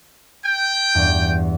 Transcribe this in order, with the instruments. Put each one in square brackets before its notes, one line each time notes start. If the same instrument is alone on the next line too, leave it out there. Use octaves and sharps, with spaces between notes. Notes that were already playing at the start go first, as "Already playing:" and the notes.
[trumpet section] G5
[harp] E2 G2